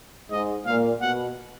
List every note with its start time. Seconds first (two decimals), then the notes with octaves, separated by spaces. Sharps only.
0.30 G#2 D#5
0.66 A#2 F5
1.01 B2 F#5